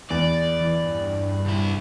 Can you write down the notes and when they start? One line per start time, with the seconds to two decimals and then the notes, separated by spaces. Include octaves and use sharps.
0.10 E2 D5
0.61 E3
0.85 G2
1.47 C2 E4